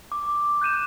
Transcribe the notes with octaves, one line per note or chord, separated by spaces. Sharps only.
D6
F#6 G6 D#7 E7